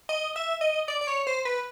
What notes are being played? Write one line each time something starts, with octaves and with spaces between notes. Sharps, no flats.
D#5
E5
D#5
D5
D5
C#5
C5
B4